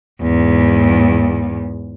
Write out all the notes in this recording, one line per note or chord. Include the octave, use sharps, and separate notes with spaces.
E2 G#2